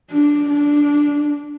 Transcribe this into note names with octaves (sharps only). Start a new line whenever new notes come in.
D4
D4